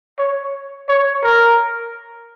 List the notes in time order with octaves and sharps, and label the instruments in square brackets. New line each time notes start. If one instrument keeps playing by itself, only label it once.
[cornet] C#5
C#5
A#4